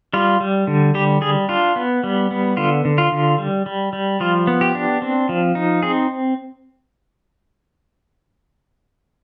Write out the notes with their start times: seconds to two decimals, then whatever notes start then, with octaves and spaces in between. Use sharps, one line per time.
0.13 G3 F4
0.41 G3
0.67 D3
0.94 G3 G4
1.21 G3 G#4
1.49 D4 F4
1.76 B3
2.03 G3
2.31 B3
2.57 D3 F4
2.85 D3
2.98 F4
3.12 D3
3.38 G3
3.66 G3
3.93 G3
4.20 F3 F4
4.47 B3
4.61 G4
4.75 D4
5.02 C4
5.29 F3
5.55 D#4
5.83 C4 G#4